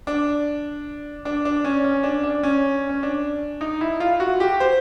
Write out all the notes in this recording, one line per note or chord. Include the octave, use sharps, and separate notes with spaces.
D4
D4
D4
C#4
C#4
D4
D4
C#4
C#4
D4
D#4
E4
F4
F#4
G4
C5